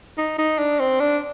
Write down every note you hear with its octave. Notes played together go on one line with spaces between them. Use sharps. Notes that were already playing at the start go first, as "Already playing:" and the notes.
D#4
D#4
D4
C4
D4